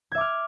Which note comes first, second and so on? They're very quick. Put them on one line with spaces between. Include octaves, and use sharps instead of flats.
G#6 E5 D6 F6